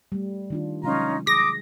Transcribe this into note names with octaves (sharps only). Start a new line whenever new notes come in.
G3 A3
D#3 D4 F4
C3 F#3 G#3 C#4 D#4 F4 A#5
G#4 D6 D#6 A#6